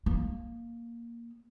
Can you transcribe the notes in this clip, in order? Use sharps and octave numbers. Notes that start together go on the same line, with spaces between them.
A#3